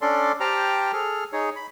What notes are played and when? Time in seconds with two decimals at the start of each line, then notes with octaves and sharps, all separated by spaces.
0.01 C#4 D4 A4 D5 C6
0.40 G4 C5 G5 A5 A#5 F6
0.93 G#4 A4 F6
1.33 D#4 G#4 C#5
1.56 B5